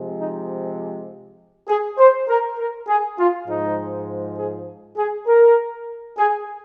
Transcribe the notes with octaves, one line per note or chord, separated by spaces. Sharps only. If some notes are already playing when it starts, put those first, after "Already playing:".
Already playing: C3 F3 G#3
D#4
G#4
C5
A#4
A#4
G#4
F4
G#2 F3 G#3 D#4
G#4
G#4
A#4
G#4